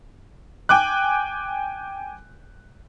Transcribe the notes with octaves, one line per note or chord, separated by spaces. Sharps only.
G5 G#5 D6 F#6